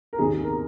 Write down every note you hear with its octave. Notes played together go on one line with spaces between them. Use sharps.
A#4
F1 D#2 D#3 G#4
G#4
A#4